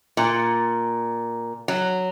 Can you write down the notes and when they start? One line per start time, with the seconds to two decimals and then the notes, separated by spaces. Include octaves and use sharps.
0.17 A#2
1.68 F#3